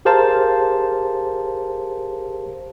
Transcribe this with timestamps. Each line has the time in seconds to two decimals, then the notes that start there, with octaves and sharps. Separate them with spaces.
0.05 G4 G#4 A#4 C5 F5 A5